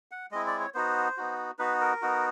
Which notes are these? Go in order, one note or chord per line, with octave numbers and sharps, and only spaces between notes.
F#5
G#3 C4 E4 D#5
D5
C#5
B3 D#4 F#4 C5
B3 D#4 F#4
B3 D#4 F#4 B4
A#4
B3 D#4 F#4